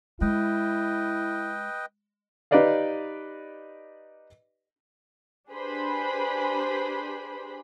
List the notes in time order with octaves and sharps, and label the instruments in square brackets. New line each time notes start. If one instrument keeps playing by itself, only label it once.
[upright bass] G#3 [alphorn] E4 [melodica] B4 D#5 G5
[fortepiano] D#4 G4 B4 D5 D#5 F5
[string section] D4 G4 G#4 B4 C5 B5